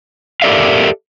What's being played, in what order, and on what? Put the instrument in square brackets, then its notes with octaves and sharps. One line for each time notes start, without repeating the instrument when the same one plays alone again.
[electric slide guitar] G4 A4 A#4 D5 E5 F5